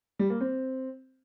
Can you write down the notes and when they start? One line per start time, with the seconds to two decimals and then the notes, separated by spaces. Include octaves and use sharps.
0.19 G3
0.30 A#3
0.41 C4